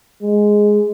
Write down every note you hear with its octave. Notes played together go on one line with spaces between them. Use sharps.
G#3